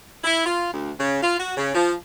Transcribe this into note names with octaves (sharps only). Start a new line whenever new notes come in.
E4
F4
D2
C#3
F4
F#4
C#3
F3